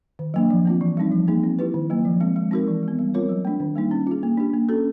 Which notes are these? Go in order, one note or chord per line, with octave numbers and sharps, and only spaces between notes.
D#3
F#3 A#3 D4
F3
A3 C4 F4
E3
G3 C4 D#4
F3
A#3 D#4 G#4
C4
E4 G4 B4
D#3
F#3 A#3
F3
G#3 C4
G#3
C4 D#4 F#4 A#4
E3
G#3
B3
G3
C4 F4 A#4 C#5
F#3
A3 D4
D#3
G3 A#3 D#4
C#4
F4 G#4
A#3
D4 G4
A#3
C#4 F#4 A4